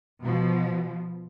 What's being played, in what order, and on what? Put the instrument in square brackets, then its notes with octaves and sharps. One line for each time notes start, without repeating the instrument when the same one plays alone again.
[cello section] B2 F3